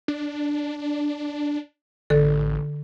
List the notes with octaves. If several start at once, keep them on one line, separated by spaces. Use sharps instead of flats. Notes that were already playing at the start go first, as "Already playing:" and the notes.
D4
A1 D3 A4